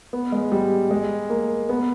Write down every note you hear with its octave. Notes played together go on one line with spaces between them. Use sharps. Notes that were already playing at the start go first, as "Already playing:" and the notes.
B3
G#3
G3
G#3
A#3
B3